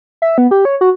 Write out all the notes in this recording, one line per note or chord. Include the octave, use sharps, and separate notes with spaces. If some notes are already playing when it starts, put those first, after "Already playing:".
E5
B3
G4
C#5
F#4